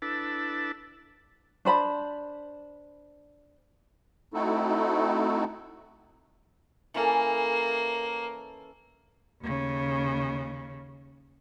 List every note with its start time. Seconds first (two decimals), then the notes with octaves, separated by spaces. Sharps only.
0.02 D4 E4 A4 B4 A5
1.65 D4 C5 B5
4.34 A3 C4 D#4 E4 F#4 A4
6.94 E3 A#3 C#4 A4
9.42 D#2 C#3